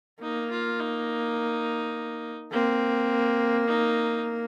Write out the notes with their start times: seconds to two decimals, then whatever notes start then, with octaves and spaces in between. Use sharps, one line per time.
0.22 A#3 D#4
0.51 F4
0.80 D#4
2.52 A#3 C4
3.67 D#4